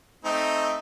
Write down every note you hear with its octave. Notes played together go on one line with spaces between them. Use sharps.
A3 C4 D#4